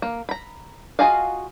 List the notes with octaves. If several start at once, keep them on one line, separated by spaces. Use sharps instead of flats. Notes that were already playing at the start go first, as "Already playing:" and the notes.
A#3
A#5 B5
F4 F#4 G#4 D#5 F5